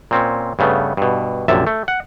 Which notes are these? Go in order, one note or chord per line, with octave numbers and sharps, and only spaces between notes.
A#2 C4 C#4
G2 C#3 A3 B3
G2 B2
A#1 F#2 C3 E5 A5
A3
F#5